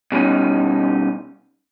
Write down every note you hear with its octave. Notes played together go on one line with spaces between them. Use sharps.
B2 G3 C#4 D#4